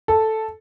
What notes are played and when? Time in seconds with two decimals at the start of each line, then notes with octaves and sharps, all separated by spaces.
0.08 A4